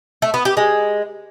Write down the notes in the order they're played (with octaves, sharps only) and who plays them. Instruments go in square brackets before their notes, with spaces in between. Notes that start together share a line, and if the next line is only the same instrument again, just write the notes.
[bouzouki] A3
B3
G4
G#3